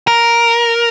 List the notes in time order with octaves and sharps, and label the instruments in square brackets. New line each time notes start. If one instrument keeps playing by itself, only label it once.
[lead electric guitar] A#4